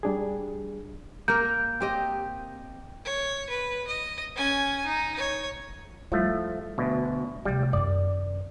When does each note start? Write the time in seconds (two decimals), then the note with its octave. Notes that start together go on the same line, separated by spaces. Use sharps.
0.03 G3 D4 G#4
1.28 A#3 A#4 G6
1.81 C4 G4 D#5
3.05 C#5
3.50 B4
3.87 D#5
4.36 C#4 G#5
4.85 D#4
5.17 C#5
6.12 F3 G3 A3 E4
6.78 D2 B2
7.45 D2 C3 G3
7.73 F#2 D#3 D5